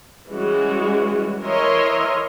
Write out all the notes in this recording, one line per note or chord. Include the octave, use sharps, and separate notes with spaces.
E3 G3 G#3 C#4 F#4
E3 A#4 C#5 D#5 E5 C6